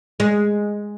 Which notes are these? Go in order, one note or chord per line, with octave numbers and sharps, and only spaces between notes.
G#3